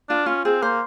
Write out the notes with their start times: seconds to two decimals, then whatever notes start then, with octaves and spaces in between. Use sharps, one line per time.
0.09 D4 F4
0.26 C#4 F4
0.45 C4 G#4
0.62 A#3 C5